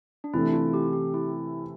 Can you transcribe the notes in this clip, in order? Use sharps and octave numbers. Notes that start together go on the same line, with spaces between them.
D4
C3 E3 A3 E4
E4
F4
G4
G4
E4